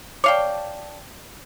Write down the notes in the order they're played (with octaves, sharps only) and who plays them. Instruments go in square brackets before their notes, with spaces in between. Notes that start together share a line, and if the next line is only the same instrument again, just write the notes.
[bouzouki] D4 A5 [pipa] C#5 F5 G5 [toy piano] D6